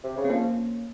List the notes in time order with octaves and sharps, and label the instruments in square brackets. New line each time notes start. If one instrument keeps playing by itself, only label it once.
[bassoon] C3
C#3
[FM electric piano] C4
[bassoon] F3 [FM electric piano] A#3 C#4